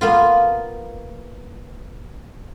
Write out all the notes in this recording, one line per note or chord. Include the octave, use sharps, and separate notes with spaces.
A#3 B3 F4